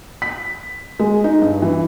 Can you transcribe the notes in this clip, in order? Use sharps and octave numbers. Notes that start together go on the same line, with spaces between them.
B6
G#3
D#4
G2
E3